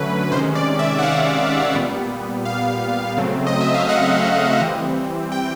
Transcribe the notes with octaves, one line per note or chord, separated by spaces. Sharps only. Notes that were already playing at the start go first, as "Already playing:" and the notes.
Already playing: D3 F#3 A3 C#4 B4
C3 D#3 G#3 C#4 C5
D5
E5
F#5
F5
A#2 G3 B3
F5
C#3 F#3 A3 C4
D#5
E5
F5
F#5
E3 G3 C4
G5